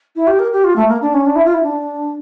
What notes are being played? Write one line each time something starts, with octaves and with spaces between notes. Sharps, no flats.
E4
G4
A#4
G4
F4
A3
A#3
D4
C#4
D4
E4
F4
E4
D4